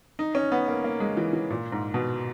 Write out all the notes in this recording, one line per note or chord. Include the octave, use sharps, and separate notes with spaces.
D#4
C#4
B3
A#3
A#3
G#3
E3
E3
A#2
G#2
B2